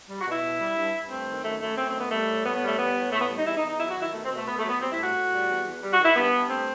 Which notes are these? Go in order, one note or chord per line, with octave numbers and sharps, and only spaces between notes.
G3
F#4
B2
E4
B2
G3
G2
G2
A3 C4
D#3
F#2 A3
F#2 A3
A3 C4
C4
D#3
B3
G3 A3
A2
A2 B3
B3
G3
A3
G3 B3
A2
A2 A3
B3
G3
D#4
E2 E4
D#4
E2
D#4
F#3 E4
F#4
D#3
E4
B2 A3
C4
B2
A3
A3 B3
A3
F#3
B3
G3 C4
E4
A2
F#4
A2
G3
E2
E2
G3
D#3 F#4
E4
G2 B3
G2
A3 C4